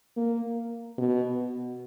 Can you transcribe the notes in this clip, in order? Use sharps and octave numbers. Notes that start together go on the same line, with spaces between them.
A#3
B2